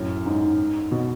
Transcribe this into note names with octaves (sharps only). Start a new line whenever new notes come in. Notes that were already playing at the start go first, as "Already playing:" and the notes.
Already playing: F#2 A2
G#2
B2